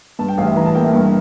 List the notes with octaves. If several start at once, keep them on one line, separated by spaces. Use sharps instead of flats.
G2 A5
G5
A1 F5
E5
E3 A#5
A5
A#3 G5
E5
G2